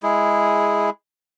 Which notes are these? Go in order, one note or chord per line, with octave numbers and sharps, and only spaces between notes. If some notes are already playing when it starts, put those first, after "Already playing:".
G#3 E4 G#4